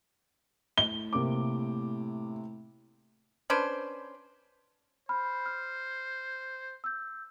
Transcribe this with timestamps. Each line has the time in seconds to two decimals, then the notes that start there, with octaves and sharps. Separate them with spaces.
0.78 A2 G7
1.13 C3 A#3 D6
3.50 C#4 D4 B4 C5
5.09 C5 B5 F6
5.46 F6
6.84 E6 G6